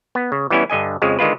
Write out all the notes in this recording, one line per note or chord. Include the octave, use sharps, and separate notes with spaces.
B3
C#3
E3 G3 B3 C#4 E4
G2 D3 D#5 G#5
F2 C#3 F3 G#3
D3 D#3 G#3 F4 B4